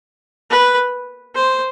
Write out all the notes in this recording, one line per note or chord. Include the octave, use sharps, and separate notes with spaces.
B4
C5